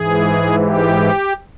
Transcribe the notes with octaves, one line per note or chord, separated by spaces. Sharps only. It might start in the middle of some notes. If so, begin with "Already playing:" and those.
Already playing: G#2 E3 G#4
G4